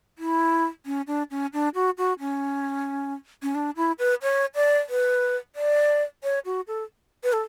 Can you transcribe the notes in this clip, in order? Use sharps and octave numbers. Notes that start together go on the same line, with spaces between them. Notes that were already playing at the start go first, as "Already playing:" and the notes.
E4
C#4
D4
C#4
D4
F#4
F#4
C#4
C#4
D4
E4
B4
C#5
D5
B4
D5
C#5
F#4
A4
B4
A4